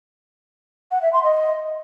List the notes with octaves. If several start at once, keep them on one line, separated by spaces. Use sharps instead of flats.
F#5
E5
C6
D#5